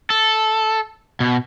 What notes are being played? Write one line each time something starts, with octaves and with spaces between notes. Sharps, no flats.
A4
B2